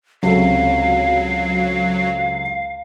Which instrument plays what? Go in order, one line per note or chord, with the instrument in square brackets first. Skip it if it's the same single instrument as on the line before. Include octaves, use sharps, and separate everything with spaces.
[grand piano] C#2 C3 A4 [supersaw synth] F#3 [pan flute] F5